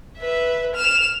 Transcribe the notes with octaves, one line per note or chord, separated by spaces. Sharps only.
B4 E5
F6 E7